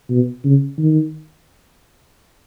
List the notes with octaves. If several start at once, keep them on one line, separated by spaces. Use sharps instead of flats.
B2
C#3
D#3